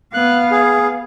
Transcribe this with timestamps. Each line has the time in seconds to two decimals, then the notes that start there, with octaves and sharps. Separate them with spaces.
0.14 B3 F5 F#6
0.51 G#4